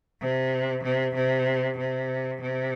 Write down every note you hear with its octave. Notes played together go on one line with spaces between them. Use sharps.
C3
C3
C3
C3
C3